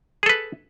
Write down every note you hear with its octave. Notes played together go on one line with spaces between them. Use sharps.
G#4 A4 B4